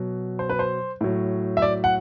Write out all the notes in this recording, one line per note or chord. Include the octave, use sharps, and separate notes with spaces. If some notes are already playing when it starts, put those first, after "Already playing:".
Already playing: B2 F#3
C5
B4
C5
A2 F#3
E5
D5
F#5